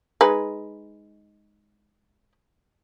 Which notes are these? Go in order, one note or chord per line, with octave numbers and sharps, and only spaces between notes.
G#3 D#4 B4